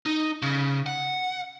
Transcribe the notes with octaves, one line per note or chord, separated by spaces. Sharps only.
D#4
C#3
F#5